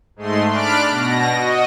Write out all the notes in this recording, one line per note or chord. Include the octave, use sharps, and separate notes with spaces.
G#2 G#3 A3 C6
D4 D5 B5 F6 F#6 D7
B2 A#6
F#4 D#5